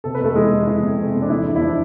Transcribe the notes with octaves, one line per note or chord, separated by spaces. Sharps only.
C3 A4
B4
F2 A3 A4
E3 G#3 G#4
E3
E3 E4
F2
C3
F2
D4
E2 E4
E2
E4
F3 D4